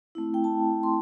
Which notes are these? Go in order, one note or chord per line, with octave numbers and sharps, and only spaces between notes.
A3 C4 E4
G5
A5
C6